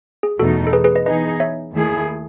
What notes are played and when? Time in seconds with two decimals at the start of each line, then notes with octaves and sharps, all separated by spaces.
0.23 G#4
0.39 E2 B2 A3 D#4 F#4 A4
0.67 A4
0.73 G#4 B4
0.84 G#4 B4
0.95 B4 D#5
1.06 E3 B3 D#4 G#4 B4 D#5
1.40 C#5 E5
1.72 D#2 D#3 A3 E4 G#4